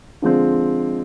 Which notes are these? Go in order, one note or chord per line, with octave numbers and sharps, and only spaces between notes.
D3 F3 G#3 C4